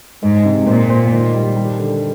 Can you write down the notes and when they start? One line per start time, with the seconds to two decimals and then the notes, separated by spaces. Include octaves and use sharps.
0.23 G#2 G#3
0.45 C3
0.67 A#2 C5
0.90 C5
1.12 D#3
1.34 G3
1.56 G3
1.79 D3